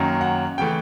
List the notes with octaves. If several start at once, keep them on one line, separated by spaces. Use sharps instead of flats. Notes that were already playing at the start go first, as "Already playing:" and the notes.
Already playing: F#2 D#3 F#3 A#3 C#4
F#5
C#3 E3 A3 G5